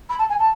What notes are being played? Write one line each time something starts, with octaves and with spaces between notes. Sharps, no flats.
B5
A5
G#5
A5